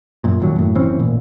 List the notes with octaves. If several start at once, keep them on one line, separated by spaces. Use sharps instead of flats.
F#2 A#2
D#1 D#2 F#3
F#2 A2
F#1 E3 C4 C#4
A1 A#2